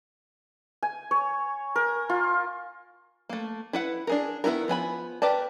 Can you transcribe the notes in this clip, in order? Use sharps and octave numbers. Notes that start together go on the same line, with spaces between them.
G#5
C#5
A#4
F4
A3 A#3
E4 B4 F#5
D4 G#4 A#4
D#3 B3 E4 A4 A#4
F3 B3 G#5 B5
G4 A#4 B4 D5 A5